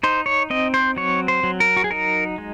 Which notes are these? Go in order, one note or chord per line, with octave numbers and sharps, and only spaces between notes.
D#4 C5
C#5
C4 D#5
C5
F#3 C#5
C5
F#3
A#4
F#4
G#4
D#4 A#4
G#3